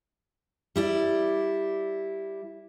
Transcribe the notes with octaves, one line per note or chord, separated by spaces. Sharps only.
G3 E4 D5